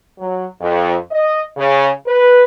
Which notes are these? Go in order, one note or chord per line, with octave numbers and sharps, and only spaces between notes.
F#3
F2
D#5
C#3
B4